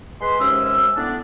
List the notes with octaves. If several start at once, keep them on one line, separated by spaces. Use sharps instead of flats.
G#3 B4 C6
D#2 C3 G#3 C#4 D#6 E6
A2 B3 D4